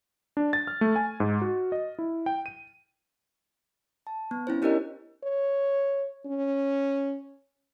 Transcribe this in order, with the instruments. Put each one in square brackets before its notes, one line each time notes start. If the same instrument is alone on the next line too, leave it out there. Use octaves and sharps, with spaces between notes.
[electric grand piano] D4
A6
F6
A3
G#5
G#2
F#4
D#5
E4
G5
D#7
[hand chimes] A5
B3
C#4 E4 C5
D4 E4 G4 A#4 C#5 D#5
[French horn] C#5
C#4